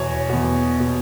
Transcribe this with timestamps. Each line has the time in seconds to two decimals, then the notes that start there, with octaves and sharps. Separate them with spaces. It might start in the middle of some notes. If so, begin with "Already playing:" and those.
Already playing: E2 B2 C#5
0.29 E2 B2
0.80 B2